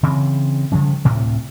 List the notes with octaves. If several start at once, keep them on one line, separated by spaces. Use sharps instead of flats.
C#3 E3 C4
C#3 F3 G3 C#4
D2 A2 C3